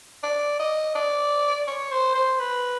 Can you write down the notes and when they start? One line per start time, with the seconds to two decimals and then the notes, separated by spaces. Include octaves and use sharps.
0.23 D5
0.59 D#5
0.95 D5
1.67 C#5
1.91 C5
2.15 C5
2.39 B4